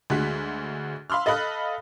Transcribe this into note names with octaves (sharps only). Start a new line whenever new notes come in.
D2 G#3 F#4 F#6 B6
F5 B5 C6 E6 F6
A4 D#5 F5 B5 D#6 F#6